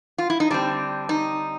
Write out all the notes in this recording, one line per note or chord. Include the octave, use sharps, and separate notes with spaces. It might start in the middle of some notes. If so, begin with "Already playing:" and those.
F4
E4
D#4
D3 G3 C4 D4
D#4